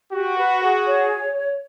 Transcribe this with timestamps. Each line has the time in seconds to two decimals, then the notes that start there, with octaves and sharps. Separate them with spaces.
0.13 F#4 G4
0.36 B4
0.62 G#4
0.87 C#5